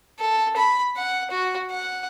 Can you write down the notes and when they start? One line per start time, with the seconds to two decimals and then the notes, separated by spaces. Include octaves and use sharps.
0.19 A4
0.56 B5
0.97 F#5
1.31 F#4
1.71 F#5